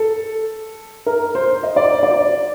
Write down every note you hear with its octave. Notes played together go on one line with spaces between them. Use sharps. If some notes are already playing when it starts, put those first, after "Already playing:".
Already playing: A4
A#4
C5
D#5
D5
C5
D5